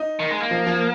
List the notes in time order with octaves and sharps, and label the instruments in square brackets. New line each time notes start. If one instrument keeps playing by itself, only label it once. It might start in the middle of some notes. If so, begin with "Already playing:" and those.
Already playing: [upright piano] D#4
[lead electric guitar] D#3
G#3
A#3
[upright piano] F3
F3